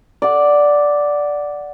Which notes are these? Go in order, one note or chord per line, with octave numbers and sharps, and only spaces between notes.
D5 F#5